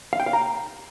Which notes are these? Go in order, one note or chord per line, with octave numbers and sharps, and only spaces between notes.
F5
G5
F5
A#5